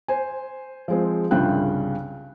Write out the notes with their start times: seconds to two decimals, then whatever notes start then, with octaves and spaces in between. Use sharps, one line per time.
0.08 C5 G#5
0.88 F3 G#3 C4
1.31 C2 G2 C#3 F4 G5 F#6